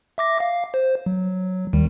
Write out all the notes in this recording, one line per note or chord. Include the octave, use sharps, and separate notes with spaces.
E5 D6 A#6
F5
C5
F#3
D#2 D#3 G3